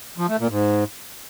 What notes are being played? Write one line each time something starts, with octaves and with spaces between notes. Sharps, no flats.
F3
A3
A#2
G#2